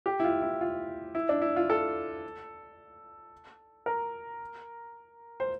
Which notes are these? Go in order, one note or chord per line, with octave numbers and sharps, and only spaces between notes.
G4
E4
F4
E4
F4
E4
D4
E4
F4
A4
A#4
C5